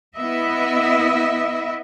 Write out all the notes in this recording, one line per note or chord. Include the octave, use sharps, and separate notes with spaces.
B3 E4 D#5 E5